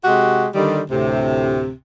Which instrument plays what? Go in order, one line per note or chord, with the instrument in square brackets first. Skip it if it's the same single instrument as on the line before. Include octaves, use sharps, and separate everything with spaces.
[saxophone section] C3 G#3 F#4 G4
D3 D#3 G3
D2 A2 C3